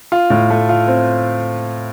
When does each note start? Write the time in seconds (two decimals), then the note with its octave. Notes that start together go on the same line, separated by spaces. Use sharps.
0.12 F4
0.30 A2
0.50 A3
0.69 F4
0.87 C4